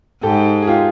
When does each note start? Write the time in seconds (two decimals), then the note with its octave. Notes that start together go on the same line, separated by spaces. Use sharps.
0.23 G#2 G4 A4
0.62 G#4
0.67 F4 G4